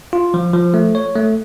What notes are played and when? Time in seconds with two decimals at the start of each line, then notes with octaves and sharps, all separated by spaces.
0.13 F4
0.34 F3
0.54 F3
0.74 A3
0.95 C#5
1.15 A3